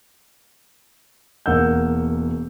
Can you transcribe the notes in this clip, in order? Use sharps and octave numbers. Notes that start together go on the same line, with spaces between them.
E1 A#3 F#5 E6 G6